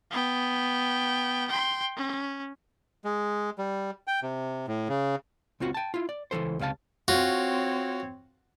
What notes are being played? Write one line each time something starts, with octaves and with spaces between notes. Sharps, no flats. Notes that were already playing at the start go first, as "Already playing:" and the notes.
B3 G5
G5 C6
C#4
G#3
G3
G5
C3
A2
C#3
C#2 C4 F4 F#4
G5 A5
E4 F4
D5
C#2 E3 F3 A4 C5
C#2 C3 F4 F5 A5
C4 F4 F#4 C#5